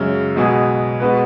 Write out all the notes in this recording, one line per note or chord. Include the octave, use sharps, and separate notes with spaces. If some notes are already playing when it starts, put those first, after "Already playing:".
Already playing: F#2 C#3 G#3
B1 B2 G#3 B3 G#4
B2 G#3 B3 F#4 B4